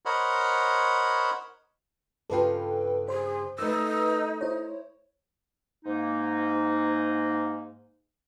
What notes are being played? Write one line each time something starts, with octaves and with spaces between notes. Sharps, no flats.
A#4 C5 C#5 D#5 F#5 B5
G2 C#3 F4 A4 B4 G5
G#4 C5 C6
A3 D#4 A#4 B4 E6
E4 C5 C#5
G#2 A#3 D#4